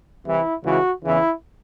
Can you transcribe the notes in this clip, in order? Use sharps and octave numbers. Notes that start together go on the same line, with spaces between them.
C2 C3 E3 E4
C#2 C#3 E3 F#4
E2 C#3 E3 E4